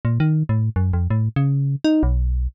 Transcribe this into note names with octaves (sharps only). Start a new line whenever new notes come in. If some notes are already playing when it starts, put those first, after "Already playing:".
A#2
D#3
A2
F#2
F2
A2
C#3
D#4
B1